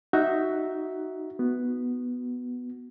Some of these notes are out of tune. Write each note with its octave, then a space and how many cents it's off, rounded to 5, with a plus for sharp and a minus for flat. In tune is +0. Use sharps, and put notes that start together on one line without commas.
D#4 +5 F#4 +10 E5 -10
B3 +0 F#4 +0